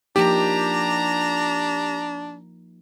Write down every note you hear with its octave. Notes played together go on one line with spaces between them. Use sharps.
F3 A#3 D4 D#4 G4 A#5